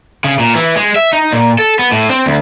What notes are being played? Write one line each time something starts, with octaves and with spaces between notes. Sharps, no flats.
C#3
A#2
E3
G#3
E5
D#4
A#2
A4
B3
A2
C4
D2